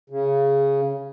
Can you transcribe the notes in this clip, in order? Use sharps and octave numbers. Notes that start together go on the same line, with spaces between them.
C#3